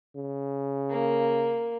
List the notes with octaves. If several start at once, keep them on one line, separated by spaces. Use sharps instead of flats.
C#3
A#3